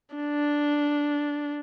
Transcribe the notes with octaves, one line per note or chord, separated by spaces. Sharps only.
D4